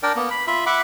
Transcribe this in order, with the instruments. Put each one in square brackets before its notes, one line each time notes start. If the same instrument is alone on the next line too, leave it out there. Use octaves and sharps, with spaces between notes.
[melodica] D4 A#4 D5 G5
A#3 B3
B5
F4 E5 B5
E5 F#5 B5 D6